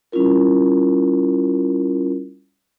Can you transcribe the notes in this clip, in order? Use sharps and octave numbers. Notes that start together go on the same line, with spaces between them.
G3 C#4 E4 F4 A#4